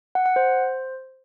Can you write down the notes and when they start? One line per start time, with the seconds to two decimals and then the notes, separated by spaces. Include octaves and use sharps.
0.15 F#5
0.26 F#5
0.36 C5